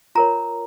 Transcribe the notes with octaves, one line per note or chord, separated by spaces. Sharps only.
F4 A#4 C#5 A#5